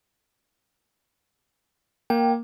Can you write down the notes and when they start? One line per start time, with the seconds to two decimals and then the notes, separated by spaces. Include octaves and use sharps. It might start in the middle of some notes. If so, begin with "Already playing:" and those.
2.10 A#3 G5